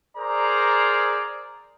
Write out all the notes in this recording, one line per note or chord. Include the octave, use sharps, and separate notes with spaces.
G#4 A#4 C5 D5 A#5